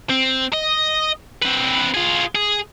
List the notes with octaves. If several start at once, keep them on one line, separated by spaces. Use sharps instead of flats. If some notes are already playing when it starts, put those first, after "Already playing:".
C4
D#5
C4 B4
F4 G#4
G#4